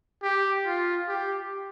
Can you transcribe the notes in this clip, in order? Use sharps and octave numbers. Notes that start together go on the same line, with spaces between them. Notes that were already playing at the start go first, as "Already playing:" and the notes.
G4
F4
G4